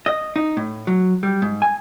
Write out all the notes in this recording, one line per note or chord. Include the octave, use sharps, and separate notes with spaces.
D#5
D#4
A2
F#3
G3
G#2
G#5